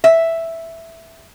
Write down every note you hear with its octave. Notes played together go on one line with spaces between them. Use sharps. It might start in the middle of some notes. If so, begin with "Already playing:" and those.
E5